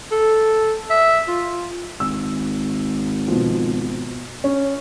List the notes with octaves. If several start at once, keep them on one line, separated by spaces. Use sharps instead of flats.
A4
E5
F4
G#1 E6
B2 F3
C#4